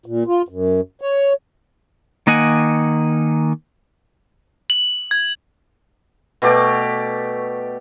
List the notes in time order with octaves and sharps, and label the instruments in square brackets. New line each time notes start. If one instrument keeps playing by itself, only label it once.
[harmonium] A#2
F4
F#2
C#5
[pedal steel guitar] D#3 A#3 D#5 F#5 G#5
[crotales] F#7
G#6
[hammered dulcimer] B2 A3 G4 D5